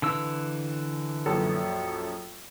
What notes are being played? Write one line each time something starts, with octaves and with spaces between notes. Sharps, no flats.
D3 E3 E6
A#1 F#2 A4